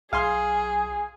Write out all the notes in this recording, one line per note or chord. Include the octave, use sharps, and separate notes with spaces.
B1 G#4 F5 G#5 C6